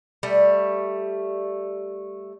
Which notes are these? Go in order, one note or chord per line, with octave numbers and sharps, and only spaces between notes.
G3 A3